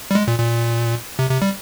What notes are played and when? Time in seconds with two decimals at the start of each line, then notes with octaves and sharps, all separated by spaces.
0.11 G3
0.15 G#3
0.28 A#2
0.39 A#2
1.19 C3
1.30 C3
1.42 G3